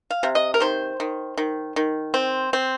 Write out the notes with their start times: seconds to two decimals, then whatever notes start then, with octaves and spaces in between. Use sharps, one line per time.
0.11 F5
0.23 C3
0.35 D#5
0.54 A#4
0.60 D#3 C5
1.00 D#3
1.38 D#3
1.76 D#3
2.14 C4
2.53 C4